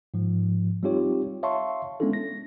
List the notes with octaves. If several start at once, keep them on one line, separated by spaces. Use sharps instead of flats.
G#2 F3
G3 C4 D#4 F4 G4 C#5
C#5 E5 F5 A5 C6 C#6
G#3 B3 C#4 D4 E4 A4
A#6